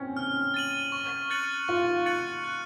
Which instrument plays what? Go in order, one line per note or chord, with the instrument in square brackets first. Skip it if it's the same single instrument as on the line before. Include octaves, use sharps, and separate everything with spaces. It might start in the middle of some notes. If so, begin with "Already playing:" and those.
Already playing: [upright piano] C4 C#4
[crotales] F6
A6 D#7 F#7
C#6
F#6 A6 C#7 F#7
[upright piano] F4 [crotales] C#6
[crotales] F#6 A6 C#7 F#7
F#6